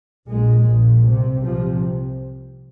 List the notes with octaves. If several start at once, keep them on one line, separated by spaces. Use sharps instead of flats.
A#1 A#2 G#3
A#1 A#2
C2 C3
C2 C3 F3